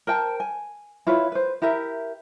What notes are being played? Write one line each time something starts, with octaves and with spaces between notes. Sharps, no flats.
A#4 C5 G5 A5
G#5
E4 F4 B4 C#5
B4 C5
E4 G4 A#4 E5